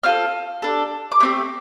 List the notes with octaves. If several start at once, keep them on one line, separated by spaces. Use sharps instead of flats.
C4 F4 A4 F6
D4 A4
D6
A3 C4 G4